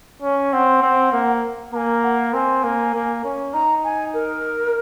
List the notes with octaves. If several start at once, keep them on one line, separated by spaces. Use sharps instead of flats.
C#4
C4 F#5
C4
A#3
A#3 G#5 A#5
F#5
C4 G#5
A#3
A#3
C#4
D#4 A#5
G#5
A#4